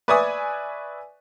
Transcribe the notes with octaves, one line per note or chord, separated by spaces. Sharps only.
B4 D5 E5 G#5 C#6 D#6